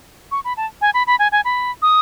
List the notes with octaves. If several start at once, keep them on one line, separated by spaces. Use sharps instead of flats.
C#6
B5
A5
G#5
B5
B5
G#5
G#5
B5
D#6